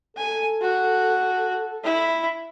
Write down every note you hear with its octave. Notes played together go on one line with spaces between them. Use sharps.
A4 G#5
F#4
E4